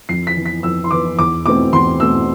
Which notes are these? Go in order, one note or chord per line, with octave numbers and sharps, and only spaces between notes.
F2 C7
B6
E3 B3
B6
F2 E6
C6
E3 B3 D6
E2 D6
B2 A3 C4 D6
E2 C6
B2 A3 C4 E6